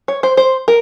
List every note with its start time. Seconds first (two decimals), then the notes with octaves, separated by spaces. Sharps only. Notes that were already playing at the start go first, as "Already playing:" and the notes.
0.08 C#5
0.23 C5
0.37 C5
0.68 A#4